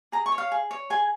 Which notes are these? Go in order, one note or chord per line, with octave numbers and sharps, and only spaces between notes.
G#4 A#5
C#6
C#5
F5
G#4
C#5
G#4 G#5